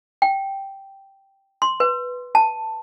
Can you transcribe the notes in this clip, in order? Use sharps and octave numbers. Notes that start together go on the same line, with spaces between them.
G5
C6
B4
A5